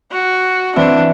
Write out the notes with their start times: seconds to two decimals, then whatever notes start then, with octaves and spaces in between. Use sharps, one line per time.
0.12 F#4
0.76 E3 C4 D4 E5